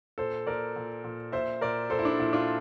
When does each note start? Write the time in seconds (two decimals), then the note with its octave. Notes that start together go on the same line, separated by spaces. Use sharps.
0.18 A#2 A4 C5
0.46 A#2 A#4 D5
0.76 A#2
1.04 A#2
1.32 A#2 C5 E5
1.61 A#2 A#4 D5
1.90 A#2 A4 C5
1.99 E4
2.05 D4
2.19 A#2 E4
2.33 D4 F4